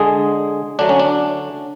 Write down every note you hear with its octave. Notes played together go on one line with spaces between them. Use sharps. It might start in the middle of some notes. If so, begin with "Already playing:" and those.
Already playing: D3 G#3 G#4
D3 F#3 A3 D4
C#4
D4